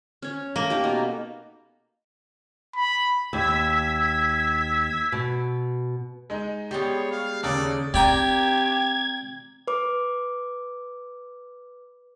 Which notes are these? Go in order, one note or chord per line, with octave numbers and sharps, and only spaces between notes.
C#4 C#5
A3 A#3
D#4 G4
B2
B5
D#2 E6 G#6 B6
B2
G#3 D#4
G3 G#3 B3 G4 C#5
F5
D#2 C#3 A#3 A4 D5
C4 G4 D5 G5 A#5 G#6
B4 D6